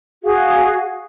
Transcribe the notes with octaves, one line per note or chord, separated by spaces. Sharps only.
F#4 G#4 F5